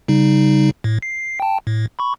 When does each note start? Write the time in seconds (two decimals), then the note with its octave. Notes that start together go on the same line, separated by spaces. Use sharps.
0.08 C#3 G3 D#4
0.84 A2
1.02 C7
1.40 G5 A5
1.67 A2
1.99 B5 C#6